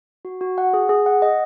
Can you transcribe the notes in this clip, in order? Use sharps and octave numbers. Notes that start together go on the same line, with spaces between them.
F#4
F#4
F#5
G#4
G#4
F#5
D#5